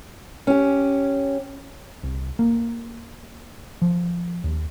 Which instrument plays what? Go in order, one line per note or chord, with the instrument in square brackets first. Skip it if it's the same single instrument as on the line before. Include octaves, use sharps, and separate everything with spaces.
[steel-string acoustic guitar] C#4 G4
[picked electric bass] C2
A#3
F3
D#2